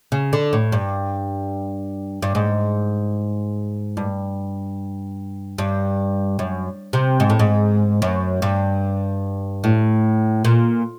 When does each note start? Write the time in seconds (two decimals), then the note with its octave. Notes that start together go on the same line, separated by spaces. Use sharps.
0.12 C#3
0.33 D3
0.53 A2
0.72 G2
2.22 G2
2.35 G#2
3.97 G2
5.58 G2
6.39 F#2
6.93 C3
7.20 G#2
7.30 A2
7.39 G#2
8.02 F#2
8.42 G2
9.64 A2
10.45 A#2